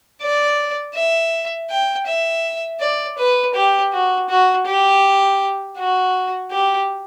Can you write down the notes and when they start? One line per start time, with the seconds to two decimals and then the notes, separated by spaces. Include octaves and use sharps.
0.22 D5
0.95 E5
1.70 G5
2.07 E5
2.80 D5
3.18 B4
3.54 G4
3.92 F#4
4.29 F#4
4.66 G4
5.77 F#4
6.51 G4